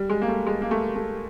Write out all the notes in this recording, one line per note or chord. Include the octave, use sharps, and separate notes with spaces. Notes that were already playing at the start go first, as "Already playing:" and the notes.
Already playing: G3
G#3
A#3
A3
G#3
A#3
A3
A3